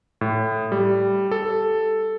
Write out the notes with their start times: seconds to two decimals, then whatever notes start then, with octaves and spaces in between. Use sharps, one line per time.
0.21 A2
0.72 G3
1.31 A4